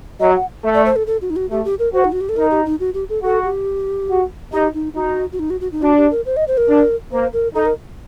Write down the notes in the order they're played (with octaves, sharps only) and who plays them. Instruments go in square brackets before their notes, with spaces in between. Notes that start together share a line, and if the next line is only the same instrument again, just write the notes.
[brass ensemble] F#3 [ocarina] D#5
[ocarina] F#5
[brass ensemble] A3
[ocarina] D5
C5
A4
A4
F#4
D#4
F#4
[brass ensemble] A3 [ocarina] G4
[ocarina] G4
A#4
[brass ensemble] F#4 [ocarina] C5
[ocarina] D#4
F#4
G4
A4
[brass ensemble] D#4 [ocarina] A#4
[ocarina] G4
D#4
F#4
G4
A4
[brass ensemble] F#4 [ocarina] A4
[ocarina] G4
[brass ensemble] F#4
[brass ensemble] D#4 [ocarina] G4
[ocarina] D#4
[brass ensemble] D#4 [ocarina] F#4
[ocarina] F#4
D#4
F#4
F#4
D#4
[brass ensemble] D4 [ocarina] F#4
[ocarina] G4
A#4
C5
D#5
C5
A#4
[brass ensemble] D4
[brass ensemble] A#3 [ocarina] C5
[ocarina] A#4
[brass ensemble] D#4 [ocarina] A4
[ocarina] A#4